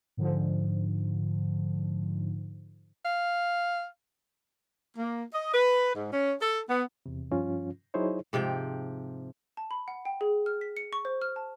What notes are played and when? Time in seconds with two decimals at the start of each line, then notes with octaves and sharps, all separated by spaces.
0.17 G#2 D3 F3
3.05 F5
4.97 A#3
5.34 D#5
5.53 B4
5.94 G#2
6.12 C#4
6.41 A4
6.69 B3
7.06 E2 C3
7.31 G2 F3 C#4 F4
7.94 F#3 D#4 E4 G#4 C5 C#5
8.33 G#2 C3 F3 G5
9.57 A5
9.71 B5
9.88 F#5
10.05 G5
10.21 G#4
10.46 F6
10.61 B6
10.77 C#7
10.93 C#6
11.05 C5
11.22 F6
11.36 A5